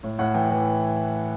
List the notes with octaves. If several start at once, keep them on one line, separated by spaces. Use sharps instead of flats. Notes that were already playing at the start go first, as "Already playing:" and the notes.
A2
A2 F#5
E3 G5
E3